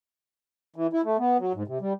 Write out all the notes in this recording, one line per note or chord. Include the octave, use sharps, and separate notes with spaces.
E3
E4
A3
B3
F#3
G#2
C3
G3